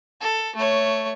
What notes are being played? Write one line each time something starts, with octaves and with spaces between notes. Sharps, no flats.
A4
A3 C#5